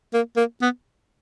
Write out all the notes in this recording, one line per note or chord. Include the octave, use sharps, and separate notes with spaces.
A#3
A#3
B3